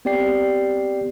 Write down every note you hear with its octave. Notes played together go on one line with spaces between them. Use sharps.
B3 C4 G4 D5 G5 C7